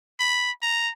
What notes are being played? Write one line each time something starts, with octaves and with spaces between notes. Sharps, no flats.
B5
A#5